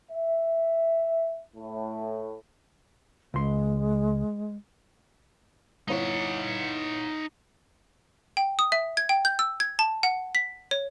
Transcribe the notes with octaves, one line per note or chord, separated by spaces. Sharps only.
E5
A2
C#2 G#3 C6
G1 D#4 E4 C#5 F#5
G5
D#6
E5
G#6
G5
G6
E6
G#6
A5
F#5
B6
C#5